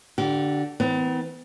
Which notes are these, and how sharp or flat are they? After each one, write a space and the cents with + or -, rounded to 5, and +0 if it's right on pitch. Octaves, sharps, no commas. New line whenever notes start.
D3 +0 G4 -35
E3 -35 B3 +45